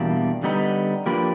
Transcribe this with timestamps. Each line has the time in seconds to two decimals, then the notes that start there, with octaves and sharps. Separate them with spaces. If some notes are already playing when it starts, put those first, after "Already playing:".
Already playing: E2 B2 G3 A#3 D4
0.43 D3 G3 B3 D#4
1.06 F3 A#3 D4 G4 B4